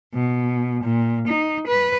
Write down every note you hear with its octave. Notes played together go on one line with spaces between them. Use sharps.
B2
A#2
D#4
B4